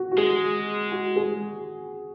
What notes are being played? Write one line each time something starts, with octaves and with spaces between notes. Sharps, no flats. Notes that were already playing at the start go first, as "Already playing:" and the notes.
Already playing: F#4
F#4
G#3 G#4
F#4
G#4